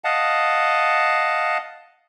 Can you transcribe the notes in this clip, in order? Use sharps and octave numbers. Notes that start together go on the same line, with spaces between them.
D#5 F5 F#5 A5